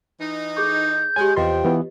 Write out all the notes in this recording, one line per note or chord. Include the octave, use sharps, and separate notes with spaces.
E3 D#4
G#4 A4 C#6 G6
G#3 G4 C#5 G#5
E2 C3 F3 F4 B4 D#5 G5 C6
E3 B3